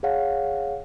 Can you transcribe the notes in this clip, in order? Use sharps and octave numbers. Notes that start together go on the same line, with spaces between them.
G#4 C#5 F5 F#5